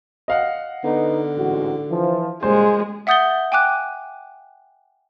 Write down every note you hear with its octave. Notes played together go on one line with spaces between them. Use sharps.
D#5 F5 F#5
D3 B3 D#4
A1 G#2 F#4
E3 F3
A#2 C#3 G3 G#3 C5
E5 F#5 D#6 G6 A6 G7
G5 G#5 D6 F#6